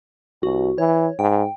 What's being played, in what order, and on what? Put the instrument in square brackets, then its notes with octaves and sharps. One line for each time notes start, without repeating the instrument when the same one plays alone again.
[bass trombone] C2 [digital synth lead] F#4
[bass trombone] E3 [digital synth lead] C#5
[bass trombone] G#2 [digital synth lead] G5